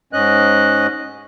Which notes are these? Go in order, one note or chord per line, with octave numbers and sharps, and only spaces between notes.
G#2 C#4 D#5 F#6